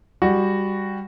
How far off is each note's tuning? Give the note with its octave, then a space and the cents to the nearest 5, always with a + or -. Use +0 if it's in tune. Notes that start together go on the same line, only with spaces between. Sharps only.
G3 +15 F#4 +0